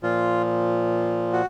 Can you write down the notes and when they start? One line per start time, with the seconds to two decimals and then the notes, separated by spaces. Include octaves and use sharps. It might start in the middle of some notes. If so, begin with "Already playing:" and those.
0.03 A#2 F3 F4
1.33 F#4